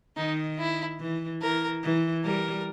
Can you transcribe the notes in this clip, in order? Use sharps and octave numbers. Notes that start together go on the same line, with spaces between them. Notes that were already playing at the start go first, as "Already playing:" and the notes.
D#3 D#4
E4
E3
E3 A#4
E3
G3 A#4